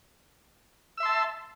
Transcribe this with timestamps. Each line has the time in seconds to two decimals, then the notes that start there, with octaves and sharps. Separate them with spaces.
0.97 E6
1.00 E5
1.03 C6
1.05 A5